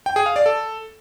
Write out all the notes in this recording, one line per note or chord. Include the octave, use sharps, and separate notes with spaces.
G5
G#4
F5
D5
A4